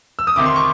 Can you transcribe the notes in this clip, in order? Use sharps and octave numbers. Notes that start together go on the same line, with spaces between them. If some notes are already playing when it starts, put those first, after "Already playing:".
E6
D#6
D2 C3 D#3 D6
C6
C#6